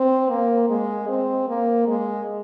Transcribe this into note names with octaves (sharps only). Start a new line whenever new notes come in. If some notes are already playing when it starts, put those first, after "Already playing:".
Already playing: C4
A#3
G#3
C4
A#3
G#3